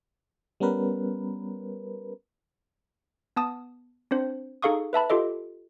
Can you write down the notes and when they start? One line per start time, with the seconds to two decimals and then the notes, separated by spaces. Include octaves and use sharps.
0.60 G3 B3 C#4 A#4 B4
3.36 B3 A5 D#6
4.11 C4 D4 C5
4.62 D#4 G#4 A4 F5 C#6 D#6
4.93 B4 E5 A5 B5
5.10 F4 G4 A4 D#5